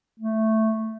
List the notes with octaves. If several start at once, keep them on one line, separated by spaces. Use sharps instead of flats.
A3